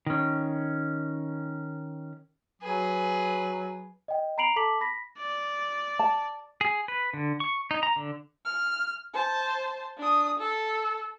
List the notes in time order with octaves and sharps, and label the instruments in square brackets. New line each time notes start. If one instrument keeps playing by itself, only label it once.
[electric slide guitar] D#3 C#4
[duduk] F#3 [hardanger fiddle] G#4 B4
[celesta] D#5 G5
A#5 B5 C7 D7 F7 F#7
A4 A5 D6 B6 F#7
B5 A#6 B6
[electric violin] D5
[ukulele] A5
[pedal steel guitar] G#4
B4
D3
C#6
D#4
A#5
D3
[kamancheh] F6
C5 A5
D4 D#6
A4